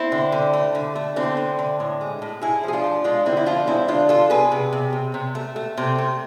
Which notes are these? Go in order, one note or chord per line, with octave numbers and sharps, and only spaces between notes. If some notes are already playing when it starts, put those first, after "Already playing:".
Already playing: C4 E4
D3
D3
A3
D3
A3
D3 C4 E4
D3
D3
A2
G#3
A2
A2 E4 G#4
F3 G#4
D4 F4
F3
G#3 D4 F4
D3 C4 E4
E4
F3 D4 F4
G#3 C4 E4
D3 D4 F4
F3 F4 A4
C3 G#4 B4
C3
C3
C3
C3
A3
A3
C3
A3